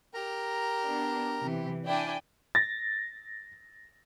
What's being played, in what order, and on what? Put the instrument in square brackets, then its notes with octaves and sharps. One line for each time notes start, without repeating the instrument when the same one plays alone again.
[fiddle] G4 [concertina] A#4 A#5
[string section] B3 D4
C3 E3
[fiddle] D4 E4 [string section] D5 G5 G#5
[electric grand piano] A6 A#6